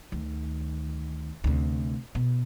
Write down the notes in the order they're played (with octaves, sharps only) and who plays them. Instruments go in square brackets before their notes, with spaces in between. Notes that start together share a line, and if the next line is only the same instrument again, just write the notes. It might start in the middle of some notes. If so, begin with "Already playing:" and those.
[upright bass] D2 D#3
D2 C3
B2